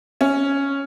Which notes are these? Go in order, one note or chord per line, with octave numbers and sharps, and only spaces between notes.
C#4